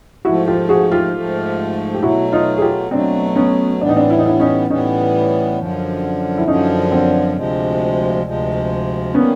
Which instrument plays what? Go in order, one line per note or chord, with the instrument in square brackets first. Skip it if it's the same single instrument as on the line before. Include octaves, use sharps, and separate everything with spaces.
[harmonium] G#2 F3 A3 [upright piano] E4 F#4
[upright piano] F4 G4
F#4 G#4
F4 G4
[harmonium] G#2 F3 A3
[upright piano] G4
[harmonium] B2 F#3 A3 [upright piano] E4 F#4
[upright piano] D#4 F4
G#4
F4 G4
[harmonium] B2 F#3 A3 [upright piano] C4 D4
[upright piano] B3 C#4
[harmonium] A2 E3 G3 B3 [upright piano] D4
[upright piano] D#4
C4 D4
E4
D#4
D4 E4
C#4 D#4
[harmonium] A2 E3 G3 B3 [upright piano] C#4 D#4
[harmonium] F#2 D3 F3
[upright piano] E4
[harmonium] F#2 D3 F3 [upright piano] C#4 D#4
[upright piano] C4 D4
[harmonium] D2 C3 F3 G#3
D2 C3 F3 G#3
[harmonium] D#3 G3 A#3 [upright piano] B3 C#4